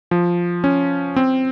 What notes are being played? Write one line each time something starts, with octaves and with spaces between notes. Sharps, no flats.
F3
C#4
C4